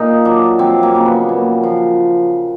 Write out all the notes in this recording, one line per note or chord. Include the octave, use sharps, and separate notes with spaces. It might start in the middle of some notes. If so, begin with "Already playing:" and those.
Already playing: A#2 D#4
F#3 D4
F3 C4
A#3
C#3
B3
A#2
F3